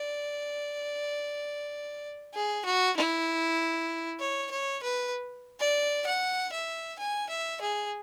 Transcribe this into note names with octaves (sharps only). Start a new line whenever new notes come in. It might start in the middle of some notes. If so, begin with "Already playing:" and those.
Already playing: D5
G#4
F#4
E4
C#5
C#5
B4
D5
F#5
E5
G#5
E5
G#4